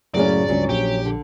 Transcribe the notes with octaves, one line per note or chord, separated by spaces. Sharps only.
F#2 A2 C#3 F#3 G#3 C#4 D5
C#2 G2 F#3 C#4
A#1 G4
D3